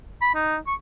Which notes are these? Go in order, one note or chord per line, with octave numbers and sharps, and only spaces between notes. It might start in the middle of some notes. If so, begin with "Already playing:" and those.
B5
D#4
C#6